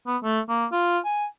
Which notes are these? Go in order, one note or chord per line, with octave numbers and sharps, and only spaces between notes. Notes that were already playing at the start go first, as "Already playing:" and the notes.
B3
A3
A#3
F4
G#5